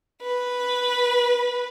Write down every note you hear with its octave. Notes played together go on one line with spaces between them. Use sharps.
B4